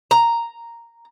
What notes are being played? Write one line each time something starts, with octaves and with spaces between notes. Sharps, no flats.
A#5